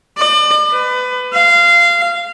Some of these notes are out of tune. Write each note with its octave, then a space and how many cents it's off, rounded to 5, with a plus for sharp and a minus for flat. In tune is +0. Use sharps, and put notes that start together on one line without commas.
D5 +40
B4 +25
F5 -20